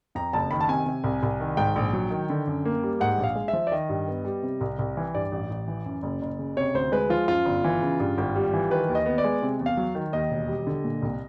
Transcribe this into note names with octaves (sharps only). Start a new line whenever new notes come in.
F2 A#5
F#1 A5
D#3 B5
A5
C3 G#5
C3
C2
C2
D#3
G#2 G5
A#1
F#3
D#3
D3
F#2
A#3
G3
G#2 F#5
A#1
F5
G#3
E5
F3
D5
D#3 D#5
G2
B3
G3
C3
C2
C2
E3
G2 D5
A1
A1
E3
F#2
F#1
F#1
C#3
C3 C#5
D2 C5
G#3 B4
F3 F4
F#2 F4
G1
E3
C#3
G2
G#1
G3
E3
D#3 B4
D#2
D#5
B3
D5
G#3
C3
E2
F5
F#3
D#3
D#2 D#5
E1
G3
D3
A#2
C2